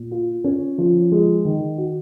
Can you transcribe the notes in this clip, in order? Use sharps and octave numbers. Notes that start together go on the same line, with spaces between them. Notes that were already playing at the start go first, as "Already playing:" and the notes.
Already playing: A#2
F4
C#4
F3
G#3
D#3
F#4